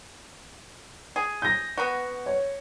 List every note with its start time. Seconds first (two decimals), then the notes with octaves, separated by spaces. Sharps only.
1.16 G#4
1.42 G6 A#6
1.78 B3 F#4
2.26 C#5